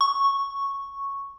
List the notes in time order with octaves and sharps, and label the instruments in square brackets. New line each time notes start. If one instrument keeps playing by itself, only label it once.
[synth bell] C#6